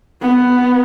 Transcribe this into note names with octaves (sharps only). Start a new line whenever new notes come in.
B3